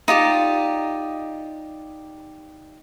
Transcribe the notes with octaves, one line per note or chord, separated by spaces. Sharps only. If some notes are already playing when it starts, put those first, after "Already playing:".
D#4 F4 G4 D5